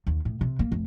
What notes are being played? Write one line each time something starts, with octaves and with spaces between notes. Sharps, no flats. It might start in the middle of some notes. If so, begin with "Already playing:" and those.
D#2
A2
C3
A#3
F1